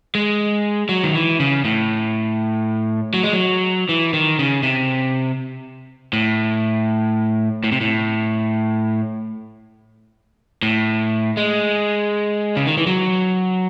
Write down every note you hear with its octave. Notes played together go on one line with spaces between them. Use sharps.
G#3
F#3
D#3
E3
C#3
A2
F#3
G#3
F#3
E3
D#3
C#3
C3
A2
A2
C3
A2
A2
G#3
C#3
D#3
E3
F#3